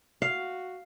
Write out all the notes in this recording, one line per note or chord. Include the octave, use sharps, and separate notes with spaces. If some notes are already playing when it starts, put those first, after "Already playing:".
F#4 F5